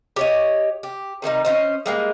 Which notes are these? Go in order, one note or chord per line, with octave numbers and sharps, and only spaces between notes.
G4 C#5 D#5
G4
C3 D#3 G3 D#4
C#4 F4 C5 D#5
G3 G#3 A#3